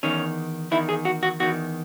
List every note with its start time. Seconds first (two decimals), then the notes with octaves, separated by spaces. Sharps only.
0.03 E2 D#3 C#4
0.71 E2 D#3 E4
0.89 G#4
1.05 F#4
1.23 F#4
1.40 E2 D#3 F#4